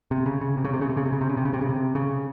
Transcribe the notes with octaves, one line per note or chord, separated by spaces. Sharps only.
C3
C#3
C#3
C3
C#3
C3
C#3
C3
C#3
C3
C#3
C3
C#3
C3
C#3
C3
C#3
C3
C#3